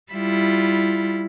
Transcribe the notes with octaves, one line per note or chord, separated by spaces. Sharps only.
G3 E4 F4